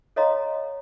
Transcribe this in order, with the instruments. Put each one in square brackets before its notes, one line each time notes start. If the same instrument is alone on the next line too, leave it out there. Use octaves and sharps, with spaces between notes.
[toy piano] A4 C#5 D#5 F5 A#5 C6